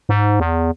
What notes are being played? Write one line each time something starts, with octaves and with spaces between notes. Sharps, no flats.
G#2
E2